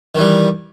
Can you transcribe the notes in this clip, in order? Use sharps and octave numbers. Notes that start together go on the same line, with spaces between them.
D#3 E3 G3